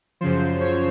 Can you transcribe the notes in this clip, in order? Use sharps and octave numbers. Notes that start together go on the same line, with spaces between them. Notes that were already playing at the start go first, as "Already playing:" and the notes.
F#2 C#3 F3 C5
C#5